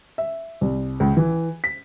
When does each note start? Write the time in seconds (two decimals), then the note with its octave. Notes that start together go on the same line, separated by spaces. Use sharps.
0.18 E5
0.61 C2
1.00 C#2
1.17 E3
1.64 B6